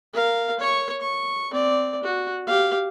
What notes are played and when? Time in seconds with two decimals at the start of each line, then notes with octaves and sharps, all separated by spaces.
0.13 A#4 F5
0.60 C#5 C#6
1.01 C#6
1.51 C4 D5
2.03 F#4
2.47 G4 F5